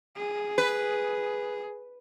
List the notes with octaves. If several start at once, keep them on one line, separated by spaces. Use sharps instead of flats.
G#4
B4